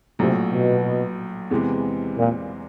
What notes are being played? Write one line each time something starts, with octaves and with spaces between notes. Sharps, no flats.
A#1 A2 C3 F#3
B2
E2 C3 E3 G#3 B3
A#2